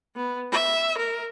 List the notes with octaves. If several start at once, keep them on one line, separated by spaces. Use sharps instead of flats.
B3
E5
A#4